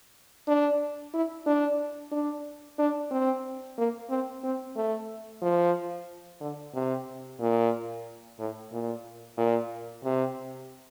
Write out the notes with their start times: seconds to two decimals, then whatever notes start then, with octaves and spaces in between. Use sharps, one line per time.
0.48 D4
1.14 E4
1.46 D4
2.12 D4
2.79 D4
3.11 C4
3.78 A#3
4.10 C4
4.44 C4
4.76 A3
5.42 F3
6.41 D3
6.75 C3
7.40 A#2
8.39 A2
8.72 A#2
9.37 A#2
10.04 C3